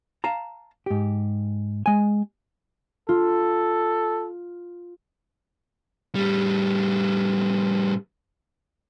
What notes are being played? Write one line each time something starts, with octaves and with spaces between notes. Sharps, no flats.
F5 A5 A#5
G#2 G4
G#3 G#5
F4 A4
A2 G3